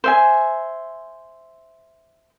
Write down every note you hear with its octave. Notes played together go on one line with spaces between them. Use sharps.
C5 E5 G#5